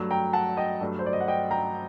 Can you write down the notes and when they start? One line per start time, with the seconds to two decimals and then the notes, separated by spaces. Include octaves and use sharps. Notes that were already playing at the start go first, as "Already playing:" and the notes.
Already playing: G2 F#3 A3
0.11 G5 A#5
0.33 F#5 A5
0.57 D#5 G5
0.81 G2 F#3 A3 D4
0.99 C5
1.06 D5
1.13 D#5
1.21 F#5
1.28 D#5 G5
1.51 G5 A#5